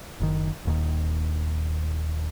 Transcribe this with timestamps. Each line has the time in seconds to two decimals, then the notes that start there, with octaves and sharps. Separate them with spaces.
0.20 F#1 D#3
0.65 D#1 D#2 D#3